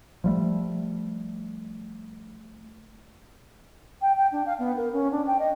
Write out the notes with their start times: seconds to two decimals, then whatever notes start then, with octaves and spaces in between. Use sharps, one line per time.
0.24 F3 G3 A3
4.02 G5
4.17 G5
4.32 D4
4.46 F5
4.59 B3
4.77 A#4
4.93 C#4
5.11 D4
5.27 G5
5.39 D#5